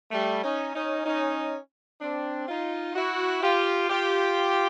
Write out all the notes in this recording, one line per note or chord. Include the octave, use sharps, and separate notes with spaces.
G3 A3
C#4 D#4
C#4 D#4
C#4 D#4
C4 D4
D#4 F4
E4 F#4
F4 G4
F4 G4